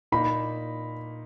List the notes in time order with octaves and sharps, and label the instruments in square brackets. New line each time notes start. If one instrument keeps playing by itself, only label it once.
[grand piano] A#2 A#3 D#4 [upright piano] B5